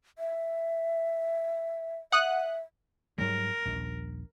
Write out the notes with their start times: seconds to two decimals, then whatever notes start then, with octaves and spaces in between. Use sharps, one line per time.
0.19 E5
2.12 E5 F#5 D#6 F#6
3.18 G#2 F#3 G3 A#4
3.65 D#1 A#1